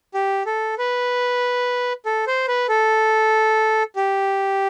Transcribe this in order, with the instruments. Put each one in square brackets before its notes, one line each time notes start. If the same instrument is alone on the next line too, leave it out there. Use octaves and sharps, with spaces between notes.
[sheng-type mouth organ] G4
A4
B4
A4
C5
B4
A4
G4